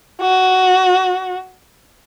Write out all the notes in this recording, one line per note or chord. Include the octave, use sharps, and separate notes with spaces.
F#4